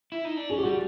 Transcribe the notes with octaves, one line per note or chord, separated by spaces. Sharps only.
E4
D#4
D4
C#4 G#4
G4
G3 F#4